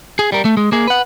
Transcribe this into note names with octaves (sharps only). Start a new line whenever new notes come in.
G#4
G3 A#4
A3
G#3
A#3 G#4
B4 F#5